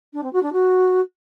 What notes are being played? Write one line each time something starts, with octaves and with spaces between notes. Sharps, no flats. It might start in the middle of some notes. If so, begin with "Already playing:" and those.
D4
C4
F#4
D4
F#4